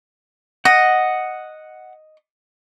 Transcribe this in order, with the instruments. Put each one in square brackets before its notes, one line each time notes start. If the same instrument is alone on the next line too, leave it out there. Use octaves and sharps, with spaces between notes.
[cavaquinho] D#5 [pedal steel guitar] F#5